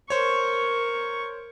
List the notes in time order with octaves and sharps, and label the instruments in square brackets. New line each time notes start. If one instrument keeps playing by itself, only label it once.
[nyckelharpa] A#4 C#6 [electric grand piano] C5 C#5